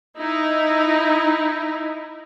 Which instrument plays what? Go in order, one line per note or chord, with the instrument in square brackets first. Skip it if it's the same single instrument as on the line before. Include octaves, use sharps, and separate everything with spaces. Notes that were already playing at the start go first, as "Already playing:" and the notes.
[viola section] D#4 E4